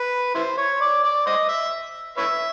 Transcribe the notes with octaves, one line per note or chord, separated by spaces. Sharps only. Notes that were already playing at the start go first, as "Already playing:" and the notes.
Already playing: B4
E4 C5
C#5
D5
D5
C5 D#5
E5
B4 C#5 E5